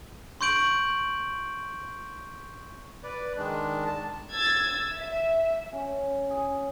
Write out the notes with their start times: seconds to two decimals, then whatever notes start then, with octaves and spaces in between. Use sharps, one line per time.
0.41 C6 C#6 G6 D7 F#7
3.04 B4 D5
3.37 D#3 G#3 D4
3.87 A5
4.32 E6 G#6 A6
4.95 E5
5.73 C#4
6.30 G#4